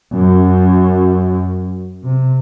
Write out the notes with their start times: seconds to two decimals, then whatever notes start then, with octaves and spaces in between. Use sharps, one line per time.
0.13 F#2
2.04 C3